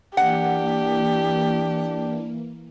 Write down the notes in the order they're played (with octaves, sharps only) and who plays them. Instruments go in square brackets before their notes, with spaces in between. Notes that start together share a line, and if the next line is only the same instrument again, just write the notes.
[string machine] E3 A#3 [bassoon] D4 [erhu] G4 [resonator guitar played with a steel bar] F#5